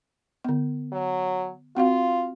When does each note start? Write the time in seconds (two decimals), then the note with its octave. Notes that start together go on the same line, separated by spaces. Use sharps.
0.44 D3 B3
0.92 F#3
1.77 C4 F4 F#4 F5